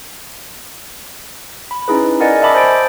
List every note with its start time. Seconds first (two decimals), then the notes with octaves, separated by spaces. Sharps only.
1.71 B5
1.88 C#4 D#4 E4 G#4 B4
2.20 A#4 D5 D#5 F#5 G#5 A6
2.42 D#5 E5 A5 B5 D6 D#6
2.55 C5 G#5 A6 D7